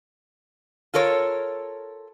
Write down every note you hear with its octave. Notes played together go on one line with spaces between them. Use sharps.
F4 A4 A#4 C#5